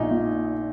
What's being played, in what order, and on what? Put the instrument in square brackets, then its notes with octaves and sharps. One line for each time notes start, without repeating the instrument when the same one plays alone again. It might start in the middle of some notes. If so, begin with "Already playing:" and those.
Already playing: [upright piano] A#1 A#2 [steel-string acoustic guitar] D#4
[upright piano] A#2